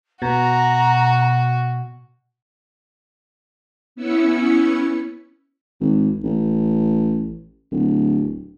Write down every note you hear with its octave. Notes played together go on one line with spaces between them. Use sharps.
B2 F#4 A#5
B3 C#4 E4 E6 C#7
G#1
A1
D1